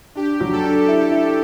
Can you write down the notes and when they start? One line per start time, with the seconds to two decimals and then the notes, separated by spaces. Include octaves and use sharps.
0.15 D4 G4
0.40 F#3
0.52 A4
0.64 D4
0.88 E4 A4
1.11 E4